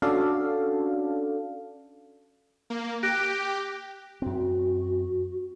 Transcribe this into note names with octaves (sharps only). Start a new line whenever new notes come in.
C#4 D4 F#4 A4 D5 F5
A#3
G4 F#6 A#6 D7
F#2 C4 F#4